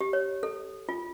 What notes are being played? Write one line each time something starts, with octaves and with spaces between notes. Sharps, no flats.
G4
C#5
A4
F4